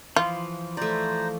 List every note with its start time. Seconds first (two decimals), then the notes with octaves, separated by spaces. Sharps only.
0.16 E3 F3 F4
0.77 A3 C5 D5 A#5